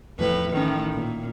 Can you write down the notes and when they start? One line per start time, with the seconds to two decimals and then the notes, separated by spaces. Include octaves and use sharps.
0.19 E2 A2 F3 B4
0.53 A1 A2 D#3 C#4
0.93 A#2